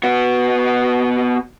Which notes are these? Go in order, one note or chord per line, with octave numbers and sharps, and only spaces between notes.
B3 F#4